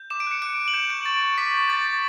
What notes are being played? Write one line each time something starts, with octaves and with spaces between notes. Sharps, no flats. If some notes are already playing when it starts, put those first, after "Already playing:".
Already playing: G6
D6 E7
D7
F#6 C#7
F#6 D7
D6
F#7
G6 E7
C#6 D7
C#6 A6
C#6
D6 B6
G6
G6 A6
D6